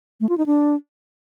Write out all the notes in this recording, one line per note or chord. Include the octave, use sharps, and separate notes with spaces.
A3
F4
D#4
D4